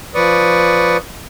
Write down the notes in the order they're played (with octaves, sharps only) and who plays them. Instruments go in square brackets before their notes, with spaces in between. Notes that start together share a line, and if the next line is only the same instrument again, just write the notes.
[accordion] F3 B4 D5 C#6 D#6